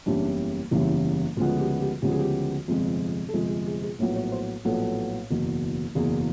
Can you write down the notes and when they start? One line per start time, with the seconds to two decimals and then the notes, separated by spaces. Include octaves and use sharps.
0.06 F#1 E2 C#3 E3 G3 D4
0.71 F#1 E2 C#3 E3 G3 E4
1.37 D2 C#3 F3 G#3 B3 F4
1.59 G4
1.80 G4
2.02 D2 C#3 F3 G#3 B3 G4
2.11 G#4
2.20 G4
2.68 G1 F2 C3 F3 G#3
3.29 A4
3.34 G1 F2 C3 F3 G#3 G#4
3.50 G#4
3.67 G#4
3.83 G#4
3.99 A#1 A2 F#3 B3
4.16 C#5
4.32 C5
4.65 A#1 A2 F#3 B3 A4
5.30 F#1 E2 B2
5.95 F#1 E2 B2 G#4